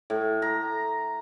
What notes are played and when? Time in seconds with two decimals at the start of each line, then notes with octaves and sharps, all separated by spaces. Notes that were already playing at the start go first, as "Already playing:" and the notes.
0.10 A2
0.42 A#5